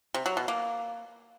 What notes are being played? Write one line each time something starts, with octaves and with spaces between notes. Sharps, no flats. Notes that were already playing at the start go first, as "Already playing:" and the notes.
C3
F#3
B2
A#3